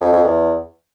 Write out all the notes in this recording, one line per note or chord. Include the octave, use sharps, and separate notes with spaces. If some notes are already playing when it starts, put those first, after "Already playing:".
F2
F2
E2